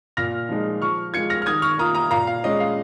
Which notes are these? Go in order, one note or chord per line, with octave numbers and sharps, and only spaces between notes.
A#2 F6 A#6
F3 G#3 D#4
F3 C#6 F6
G#3 F4 G#6 C#7
F6 A#6
F6
D#3 D#6 G#6
C#6 F6
A#3 F4 A#5 D#6
A#5 D#6
A#2 F5 A#5
F5
G#3 C#4 D#5
F5